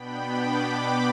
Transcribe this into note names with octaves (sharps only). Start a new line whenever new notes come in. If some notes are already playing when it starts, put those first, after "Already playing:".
Already playing: B2 B3 D4 G5 B5
B5 D6